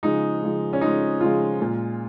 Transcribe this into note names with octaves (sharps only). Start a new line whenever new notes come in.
C#3 F3 G#3 D#4
C#3 F3 G#3
C#4
C#3 F3 G#3 D#4
C#3 F3 G#3 F4
A#2 G#3